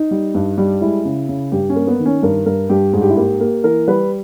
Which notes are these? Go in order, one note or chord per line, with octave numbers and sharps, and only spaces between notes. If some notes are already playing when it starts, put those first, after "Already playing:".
Already playing: D#4
G3
G2
G3
G#3 E4
C#3
C#3
G2 G4
C#4
A#3
B3
D#3
C#4
G2 A#4
G2 A#4
G2 G4
G#2 G#4
G4
E4
A#3 G4
A#3
E3 A#4
G3 B4